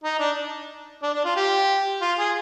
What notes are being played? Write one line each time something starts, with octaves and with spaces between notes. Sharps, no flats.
D#4
D4
D4
D4
F4
G4
F4
G#4